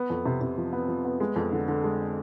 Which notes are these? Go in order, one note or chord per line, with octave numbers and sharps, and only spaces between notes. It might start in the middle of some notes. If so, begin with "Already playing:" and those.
Already playing: B3
F2
C3
C3
F3
B3
F3
B3
G#3
F2
D3
D3
G#3